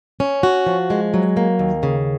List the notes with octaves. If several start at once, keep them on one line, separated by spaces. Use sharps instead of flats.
C#4
F#4
F3
G#3
F#3
A#3
D#2
C#3